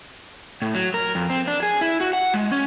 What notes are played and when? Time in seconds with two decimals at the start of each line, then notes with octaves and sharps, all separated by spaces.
0.62 A2
0.75 F#3
0.94 A#4
1.15 F2
1.30 C4
1.48 D4
1.63 G#4
1.81 E4
2.01 F#4
2.13 F#5
2.34 G#3
2.51 C#4